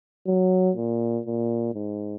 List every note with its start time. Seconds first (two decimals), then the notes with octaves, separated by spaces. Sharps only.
0.27 F#3
0.76 A#2
1.26 A#2
1.74 G#2